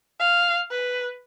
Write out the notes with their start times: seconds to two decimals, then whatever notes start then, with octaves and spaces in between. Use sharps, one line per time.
0.20 F5
0.71 B4